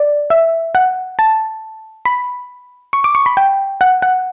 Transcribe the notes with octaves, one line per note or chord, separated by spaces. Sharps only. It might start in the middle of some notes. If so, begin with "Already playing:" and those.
Already playing: D5
E5
F#5
A5
B5
C#6
D6
C#6
B5
G5
F#5
F#5